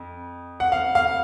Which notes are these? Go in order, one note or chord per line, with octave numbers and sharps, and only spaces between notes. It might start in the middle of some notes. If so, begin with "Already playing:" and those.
Already playing: F2
F#5
F5
F5